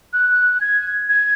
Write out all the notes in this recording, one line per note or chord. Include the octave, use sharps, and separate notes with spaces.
F#6
G#6
G#6